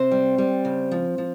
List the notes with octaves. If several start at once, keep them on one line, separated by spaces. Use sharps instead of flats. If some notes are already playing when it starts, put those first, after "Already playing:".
Already playing: C3 C4 C5
G3
G3
C#3
F3
F3